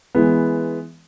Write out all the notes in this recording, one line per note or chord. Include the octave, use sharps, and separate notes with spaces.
E3 G#3 B3